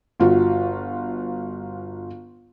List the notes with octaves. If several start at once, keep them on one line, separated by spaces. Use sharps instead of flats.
G1 F4 F#4